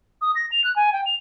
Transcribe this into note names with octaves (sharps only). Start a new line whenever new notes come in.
D#6
A#6
F7
F#6
G#5
G5
F7